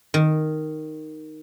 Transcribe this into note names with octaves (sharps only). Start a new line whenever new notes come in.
D#3